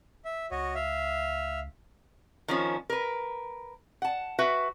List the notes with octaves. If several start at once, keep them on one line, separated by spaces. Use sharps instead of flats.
E5
C#2 F#4 C#5 D#5
E5 F5
D#3 F3 C#4
A#4 B4
F#5 A5
F#4 B4 E5